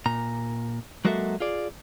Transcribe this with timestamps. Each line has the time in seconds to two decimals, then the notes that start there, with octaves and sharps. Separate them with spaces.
0.06 A#2 A#5
1.05 F#3 G#3 A#3 F#4 A4 E5
1.40 F4 G#4 D5